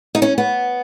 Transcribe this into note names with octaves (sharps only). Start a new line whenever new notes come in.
D#4
C#4
B3